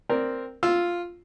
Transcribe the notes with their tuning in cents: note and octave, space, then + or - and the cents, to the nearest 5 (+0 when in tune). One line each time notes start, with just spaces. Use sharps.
C4 +0 A#4 +0 D5 +0
F4 +0 E6 +0